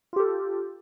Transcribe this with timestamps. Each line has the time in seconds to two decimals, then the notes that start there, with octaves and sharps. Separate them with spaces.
0.13 F4
0.16 G4
0.20 A4